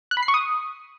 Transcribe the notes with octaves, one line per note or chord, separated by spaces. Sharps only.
F#6
B5
C7
C#6
D#6